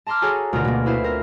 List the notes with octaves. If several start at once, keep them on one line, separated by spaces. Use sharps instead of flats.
A5 A#5 C6 D6 F6
F#4 G#4 A4 C#5 G#5 A#5
D2 B2 F4 A#4
B2 A#3
E4 B4 C5 F5
C4 A#4